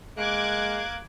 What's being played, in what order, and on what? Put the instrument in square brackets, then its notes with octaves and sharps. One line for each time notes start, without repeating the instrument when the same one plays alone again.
[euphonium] G#3 [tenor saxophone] A#3 [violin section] D6 F#6 G#6